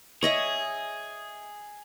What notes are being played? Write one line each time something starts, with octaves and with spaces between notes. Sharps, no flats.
G#4 C#5 D#5 E5